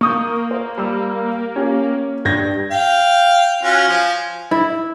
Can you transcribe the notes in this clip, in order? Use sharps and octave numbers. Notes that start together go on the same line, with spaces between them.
A#3 C#6 D#6 G6
C5
G3 E6
C#4 G4
G2 G6 G#6 A#6
F5 G5
C#4 F4 F#4
F3 G#5
E4